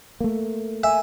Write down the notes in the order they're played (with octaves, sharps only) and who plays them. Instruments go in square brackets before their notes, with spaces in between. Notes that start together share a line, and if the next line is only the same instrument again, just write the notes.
[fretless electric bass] A3 A#3
[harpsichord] E5 [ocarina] G#5